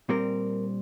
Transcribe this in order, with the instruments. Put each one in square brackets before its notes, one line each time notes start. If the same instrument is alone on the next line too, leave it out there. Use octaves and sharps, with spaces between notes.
[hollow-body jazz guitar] A#2 G3 C4 A#4